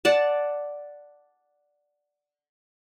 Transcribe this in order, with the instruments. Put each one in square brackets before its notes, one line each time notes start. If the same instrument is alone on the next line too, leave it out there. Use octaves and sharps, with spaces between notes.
[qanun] D5 F#5 A5